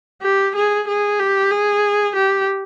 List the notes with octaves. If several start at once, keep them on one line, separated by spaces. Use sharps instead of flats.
G4
G#4
G#4
G4
G#4
G4